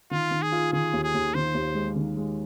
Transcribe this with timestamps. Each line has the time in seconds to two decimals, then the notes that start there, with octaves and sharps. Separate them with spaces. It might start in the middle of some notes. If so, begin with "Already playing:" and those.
0.11 D#3 F4
0.31 D#3
0.42 G#4
0.52 F4
0.73 D#3 G#4
0.93 D#2
1.03 G#4
1.14 D#2
1.34 D#3 C5
1.54 D#2
1.75 G#3
1.96 D#3
2.17 G#3